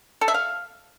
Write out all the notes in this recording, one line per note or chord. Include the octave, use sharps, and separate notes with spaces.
A4
E5
F5